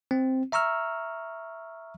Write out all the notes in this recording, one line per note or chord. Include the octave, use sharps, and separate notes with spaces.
C4
E5 A#5 C#6 E6 F6